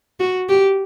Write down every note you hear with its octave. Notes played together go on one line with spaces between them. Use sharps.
F#4
G4